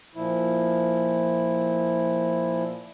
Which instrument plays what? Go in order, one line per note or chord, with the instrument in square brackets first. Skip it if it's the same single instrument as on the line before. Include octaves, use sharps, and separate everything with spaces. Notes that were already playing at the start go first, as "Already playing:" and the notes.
[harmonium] A#2 F3 E4